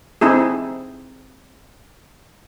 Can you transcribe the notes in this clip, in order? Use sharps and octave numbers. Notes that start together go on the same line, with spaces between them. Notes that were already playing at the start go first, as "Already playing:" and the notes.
C4 D#4 E4 G#4